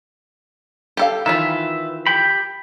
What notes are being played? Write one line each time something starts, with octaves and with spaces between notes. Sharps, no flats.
G4 A4 F5
D#3 E3 F4 B4 E5
G4 G5 B5